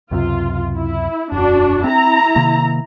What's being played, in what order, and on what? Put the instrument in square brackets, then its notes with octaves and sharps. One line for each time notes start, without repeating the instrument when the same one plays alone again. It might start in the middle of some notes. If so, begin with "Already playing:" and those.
[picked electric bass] C#2 F#2 C3 [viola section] F4
[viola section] E4
[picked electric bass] E1 F#2 [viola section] D4 F#4
[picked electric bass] C4 [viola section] E4 A#5
[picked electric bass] C3 D#3 A#3